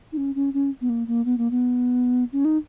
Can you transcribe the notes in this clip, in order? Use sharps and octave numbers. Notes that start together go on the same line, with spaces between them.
D#4
C#4
C#4
C#4
B3
A#3
A#3
B3
A#3
B3
C#4
D#4